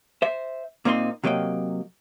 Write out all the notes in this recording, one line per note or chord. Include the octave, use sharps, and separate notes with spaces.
C5 E5
A#2 A#3 C4 D#4 C6
C3 F#3 A#3 D#5 G5